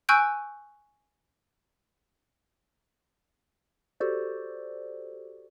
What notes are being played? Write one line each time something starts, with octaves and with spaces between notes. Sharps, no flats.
G#5 C#6 E6 F#6 G6 D7
F#4 G4 A4 C5 D5